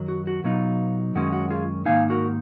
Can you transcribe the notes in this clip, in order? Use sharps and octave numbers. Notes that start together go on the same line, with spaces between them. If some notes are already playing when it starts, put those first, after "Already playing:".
Already playing: F#2 D#3 F#3
F#4
F#4
B2 F#3 B3 D#4 F4
F#2 D#3 G#3 C#4 F#4
F#4
F4 G#4
G#2 D#3 A#3 D#4 F5 G#5
F#4 A#4